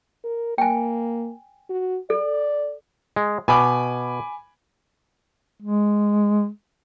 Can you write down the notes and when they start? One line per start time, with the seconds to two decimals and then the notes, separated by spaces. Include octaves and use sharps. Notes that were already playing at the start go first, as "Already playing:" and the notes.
0.24 A#4
0.58 A#3 G5 G#5
1.69 F#4
2.10 A4 D5
3.16 G#3
3.48 B2 G#5 B5 D6
5.62 G#3